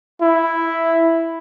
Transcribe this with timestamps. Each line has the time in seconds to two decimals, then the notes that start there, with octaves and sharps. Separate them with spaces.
0.21 E4